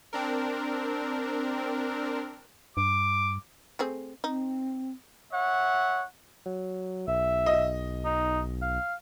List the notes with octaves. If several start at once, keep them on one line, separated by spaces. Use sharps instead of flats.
C4 D4 A#4
G2 D6
A3 C4 G#4
C4 D#4
C#5 E5 F#5
F#3
B1 E5
D#5
D#4
F5